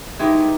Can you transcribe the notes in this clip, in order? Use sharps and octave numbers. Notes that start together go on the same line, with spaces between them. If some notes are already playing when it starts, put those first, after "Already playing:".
D#3 G#3 B3 D#4 E4 G4